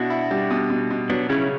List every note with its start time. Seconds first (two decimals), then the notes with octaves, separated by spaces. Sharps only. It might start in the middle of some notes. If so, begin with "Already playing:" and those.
Already playing: B2 D4 E4 F#4
0.10 E4
0.31 G3
0.50 B2
0.70 B2
0.90 B2
1.10 F#3 B3 D4
1.29 C#3 C#4 E4